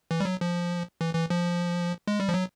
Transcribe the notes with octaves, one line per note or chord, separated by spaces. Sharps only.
E3
G3
F#3
F3
E3
E3
F3
G#3
G3
F3
F#3